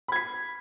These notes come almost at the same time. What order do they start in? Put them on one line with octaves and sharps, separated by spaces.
B5 G#6 B6